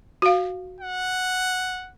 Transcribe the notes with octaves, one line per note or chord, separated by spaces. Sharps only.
F#4 F5
F#5